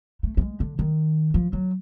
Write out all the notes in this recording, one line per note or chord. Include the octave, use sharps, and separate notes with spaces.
A3
A3
G#3
D3
D#3
F3
F#3